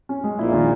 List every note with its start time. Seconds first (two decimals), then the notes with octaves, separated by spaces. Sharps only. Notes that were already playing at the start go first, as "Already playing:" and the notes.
0.09 C#4
0.24 G#3
0.39 A#1 A#2 E4
0.54 D#3